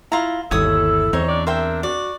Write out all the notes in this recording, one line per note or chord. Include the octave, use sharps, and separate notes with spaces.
E4 F4 A#5
G1 D#2 E4 A4 C#5 D#6 E6
E2 C4 D#4 C#5
C4 D4 D5
A#4 C5 E5 G5
F#4 D5